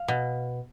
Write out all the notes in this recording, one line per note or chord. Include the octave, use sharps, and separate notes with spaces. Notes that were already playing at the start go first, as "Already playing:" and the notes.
Already playing: F5
B2